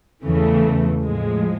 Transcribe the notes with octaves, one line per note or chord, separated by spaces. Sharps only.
E2 C#3 E3 A3
A2 F3 G#3